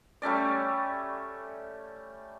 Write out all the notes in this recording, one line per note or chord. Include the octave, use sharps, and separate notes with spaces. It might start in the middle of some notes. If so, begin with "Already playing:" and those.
G3 A3 C#4 D5